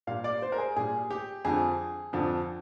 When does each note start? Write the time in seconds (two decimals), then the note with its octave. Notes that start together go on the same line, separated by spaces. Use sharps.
0.07 A#2 G3 F5
0.24 D5
0.42 C5
0.52 A#4
0.58 G#4
0.76 A#2 G3 G#4
1.11 G4
1.45 F2 D3 F3 G#4
2.13 F2 D3 F3